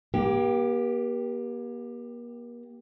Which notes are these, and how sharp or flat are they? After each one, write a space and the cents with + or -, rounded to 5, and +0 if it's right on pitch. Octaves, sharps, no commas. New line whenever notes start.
A#3 +40 G4 +0